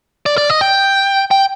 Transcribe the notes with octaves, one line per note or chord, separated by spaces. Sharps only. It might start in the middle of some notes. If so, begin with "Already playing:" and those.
D5
D5
D#5
G5
G5